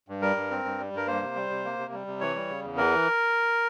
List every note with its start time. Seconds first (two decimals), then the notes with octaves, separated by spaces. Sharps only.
0.08 G2
0.22 G3 A#4
0.36 G2
0.51 C4
0.65 G2
0.78 G3
0.93 G2 A#4
1.07 A#3 C5
1.22 C3
1.36 G3
1.50 C3
1.65 A#3
1.78 C3
1.92 G3
2.07 C3
2.20 E3 C#5
2.35 G3
2.50 C#3
2.64 E2
2.77 E3 A#4